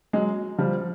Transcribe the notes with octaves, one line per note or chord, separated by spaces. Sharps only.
F#3 G#3
F3 G3